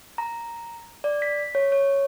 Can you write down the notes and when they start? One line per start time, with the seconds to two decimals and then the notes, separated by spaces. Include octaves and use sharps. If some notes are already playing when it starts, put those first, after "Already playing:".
0.18 A#5
1.04 D5
1.22 B6
1.55 C#5
1.72 C#5